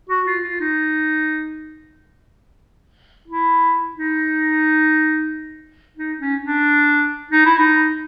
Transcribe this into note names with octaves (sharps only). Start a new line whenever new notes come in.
F#4
F4
F4
D#4
E4
D#4
D#4
C#4
D4
D#4
E4
D#4